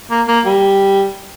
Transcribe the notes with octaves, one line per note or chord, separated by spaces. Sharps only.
A#3
A#3
G3